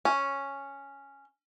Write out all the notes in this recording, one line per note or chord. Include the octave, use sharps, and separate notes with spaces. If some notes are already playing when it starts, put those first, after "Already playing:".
C#4